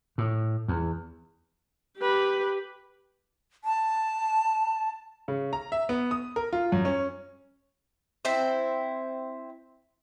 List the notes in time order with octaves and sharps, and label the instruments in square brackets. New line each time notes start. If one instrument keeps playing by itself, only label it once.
[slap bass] A2
E2
[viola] G4 B4
[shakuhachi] A5
[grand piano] C#3
A#5
E5
B3
D#6
A#4
F4
F#2
C#4
[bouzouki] C4 E4 C5